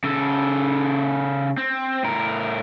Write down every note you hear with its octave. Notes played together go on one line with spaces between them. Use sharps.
C#3 A4
C4
A2 A#4